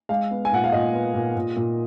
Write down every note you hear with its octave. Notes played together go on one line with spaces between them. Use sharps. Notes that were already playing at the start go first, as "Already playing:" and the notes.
G#3 F5
B3
G#5
A#2 F#5
F5
A#2 D#5
B3
A#2
A#2
A#2